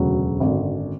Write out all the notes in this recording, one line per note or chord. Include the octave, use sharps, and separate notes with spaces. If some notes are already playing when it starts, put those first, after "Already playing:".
Already playing: E1 D2 C#3 F#3
G#1 F#2 D3